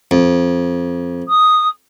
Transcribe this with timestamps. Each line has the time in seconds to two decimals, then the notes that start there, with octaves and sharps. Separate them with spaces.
0.11 F2
1.29 D#6